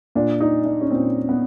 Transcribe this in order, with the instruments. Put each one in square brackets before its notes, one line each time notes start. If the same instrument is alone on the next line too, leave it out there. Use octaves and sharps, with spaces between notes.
[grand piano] A#2 D4
D#4
D4
C#4
A#2 C4
B3